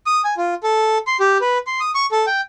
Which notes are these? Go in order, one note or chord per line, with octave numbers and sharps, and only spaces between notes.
D#6
G#5
F4
A4
C6
G4
B4
C6
D#6
C#6
A4
G5